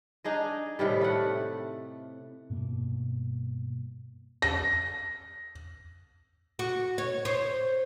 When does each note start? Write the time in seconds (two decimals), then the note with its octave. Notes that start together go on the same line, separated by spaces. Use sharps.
0.24 D4 D#4 G#4 D#5
0.79 A2 C3 D#3 G3
1.01 A3 F#5
2.50 G2 B2 A#3
4.42 A#6
6.59 F#4
6.98 C#5
7.25 C5 C#5